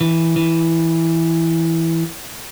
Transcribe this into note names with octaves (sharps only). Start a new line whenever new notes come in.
E3
E3